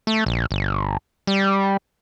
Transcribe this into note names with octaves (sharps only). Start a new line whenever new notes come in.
A3
A#1
G1
G3